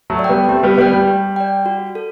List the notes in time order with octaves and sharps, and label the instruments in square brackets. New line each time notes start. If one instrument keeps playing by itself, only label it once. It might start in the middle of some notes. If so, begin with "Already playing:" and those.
[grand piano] F#3 A3
[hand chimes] D5
[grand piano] G3 B3 [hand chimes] G5
[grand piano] A3 C4 [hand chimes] G4
[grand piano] G3 B3
[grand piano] G3 B3 [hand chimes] D5 G5
[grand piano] G3
[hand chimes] G4
D5 G5
F#4
A4